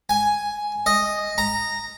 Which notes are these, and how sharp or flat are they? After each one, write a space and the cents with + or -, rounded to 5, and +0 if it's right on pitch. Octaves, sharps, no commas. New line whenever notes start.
G#5 +5
D#5 -5
A#5 -10